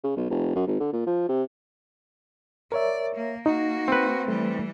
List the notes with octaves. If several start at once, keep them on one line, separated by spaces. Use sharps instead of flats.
C#3
B1
F1
F#2
G#1
D3
A#2
F3
C3
A#4 C#5 D5 E5
A#3
A#3 D#4 F#4
C4 B4
E3 G3 A3